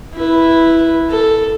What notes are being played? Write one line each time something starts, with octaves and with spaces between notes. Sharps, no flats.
E4 B4
A4